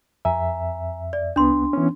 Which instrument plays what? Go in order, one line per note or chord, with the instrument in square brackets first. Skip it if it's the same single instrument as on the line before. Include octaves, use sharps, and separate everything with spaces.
[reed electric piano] F2 E5 [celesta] G#5 A#5
[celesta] D5
[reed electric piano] C2 B3 [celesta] D4 C6
[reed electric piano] E3 B3 C#4